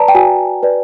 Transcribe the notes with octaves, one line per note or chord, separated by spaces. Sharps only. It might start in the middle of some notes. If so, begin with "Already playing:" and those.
Already playing: B4 D5 A5 A#5
G5
F#4 G#5
B4 D5